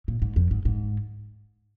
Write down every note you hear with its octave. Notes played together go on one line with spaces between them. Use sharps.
A#2
G#2
F2
G#2
G#2